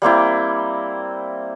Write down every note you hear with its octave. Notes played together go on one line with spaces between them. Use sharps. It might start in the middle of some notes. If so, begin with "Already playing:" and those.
G3 A#3 C4 E4